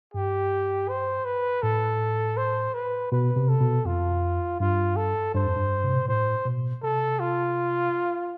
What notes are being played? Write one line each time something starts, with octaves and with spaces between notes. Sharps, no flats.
G2 G4
C5
B4
A2 A4
C5
B4
B2 B4
C3
A4
B2
F2 F4
G2 F4
A4
G2 C5
F2
G2
C3
B2
A2 C5
B2
C3 A4
F4